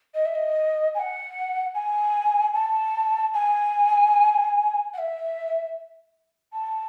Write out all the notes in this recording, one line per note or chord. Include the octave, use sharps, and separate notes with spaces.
D#5
E5
D#5
G#5
F#5
G#5
A5
G#5
F#5
E5
A5